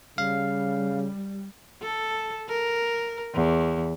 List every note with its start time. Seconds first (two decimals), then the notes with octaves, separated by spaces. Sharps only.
0.18 C#3 G3 F5
1.82 A4
2.48 A#4
3.34 E2